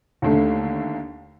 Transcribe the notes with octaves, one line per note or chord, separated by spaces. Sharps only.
D#2 D3 A3